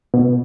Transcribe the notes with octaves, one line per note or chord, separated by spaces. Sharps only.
B2